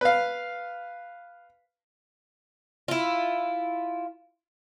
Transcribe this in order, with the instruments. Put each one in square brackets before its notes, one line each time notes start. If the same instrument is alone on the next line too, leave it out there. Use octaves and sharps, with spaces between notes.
[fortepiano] B4 F5
[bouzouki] E4 F4